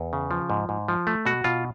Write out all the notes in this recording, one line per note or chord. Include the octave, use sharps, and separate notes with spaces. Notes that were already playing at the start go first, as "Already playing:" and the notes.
Already playing: E2
C#3
F3
G#2
G#2
F3
A3
B2 F#4
B2 F4